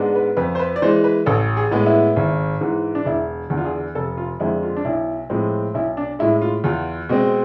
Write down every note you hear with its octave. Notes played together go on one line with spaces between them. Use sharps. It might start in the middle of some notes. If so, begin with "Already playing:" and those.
Already playing: G#2 G#3 B3 D4
B4
F2 B4
C5
B4
D5
E3 G#3 C5
B4
A1 A4
G#4
A2 G#3 B3
E4
G#1
G#2 E3
D4
E1 E4
E2 D3
F4
G#4
F1 A4
F4
F2 D3 G#3 E4
F4
D4
B1 E4
A2 F3 G#3 C4
B1 E4
D4
A2 G#3 E4
F4
E2 F4
B2 G#3 C4